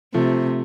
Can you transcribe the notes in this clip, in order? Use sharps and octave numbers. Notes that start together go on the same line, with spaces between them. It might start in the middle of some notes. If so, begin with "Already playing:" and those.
C3 F3 A3